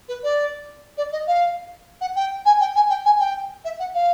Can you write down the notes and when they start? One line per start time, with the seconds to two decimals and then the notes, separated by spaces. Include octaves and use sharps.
0.09 B4
0.23 D5
0.98 D5
1.12 D#5
1.27 F5
2.01 F#5
2.16 G5
2.45 G#5
2.60 G5
2.75 G#5
2.90 G5
3.05 G#5
3.20 G5
3.65 E5
3.79 F#5
3.94 F5